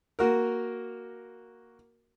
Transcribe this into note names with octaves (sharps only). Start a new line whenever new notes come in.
A#3 F#4 A#4